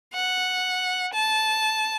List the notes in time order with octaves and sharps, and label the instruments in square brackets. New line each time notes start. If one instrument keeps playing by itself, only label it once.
[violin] F#5
A5